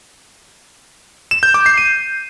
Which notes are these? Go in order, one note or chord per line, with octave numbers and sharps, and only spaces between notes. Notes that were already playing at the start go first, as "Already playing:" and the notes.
E7
G6
D6
C7
D#7